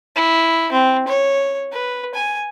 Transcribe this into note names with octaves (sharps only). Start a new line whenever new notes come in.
E4
C4
C#5
B4
G#5